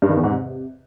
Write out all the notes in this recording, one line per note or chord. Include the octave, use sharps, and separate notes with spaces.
G2
D#3
E2
G#2
C3